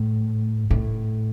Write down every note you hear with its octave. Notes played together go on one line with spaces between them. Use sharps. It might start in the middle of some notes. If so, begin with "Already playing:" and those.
Already playing: A2
A2